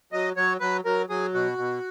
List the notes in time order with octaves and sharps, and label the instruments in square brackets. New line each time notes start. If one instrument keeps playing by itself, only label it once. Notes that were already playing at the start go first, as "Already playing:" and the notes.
[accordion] F#3 D#5
F#3 C#5
F#3 B4
F#3 A#4
F#3 G#4
B2 F#4
B2